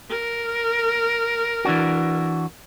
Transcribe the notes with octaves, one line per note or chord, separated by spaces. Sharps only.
A#4
E3 D4 F#4